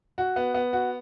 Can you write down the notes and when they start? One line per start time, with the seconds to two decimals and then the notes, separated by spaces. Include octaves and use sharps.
0.18 F#4
0.36 B3
0.54 B3
0.73 F#4